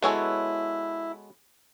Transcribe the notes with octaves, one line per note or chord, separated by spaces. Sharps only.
G#3 B3 E4 F#4 A4 C#5 G#5